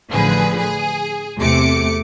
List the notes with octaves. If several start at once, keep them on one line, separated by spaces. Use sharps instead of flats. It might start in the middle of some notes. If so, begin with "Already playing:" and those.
A1 A2 D3 F3 G#4 B4
G#4
E2 C3 A3 D6 C#7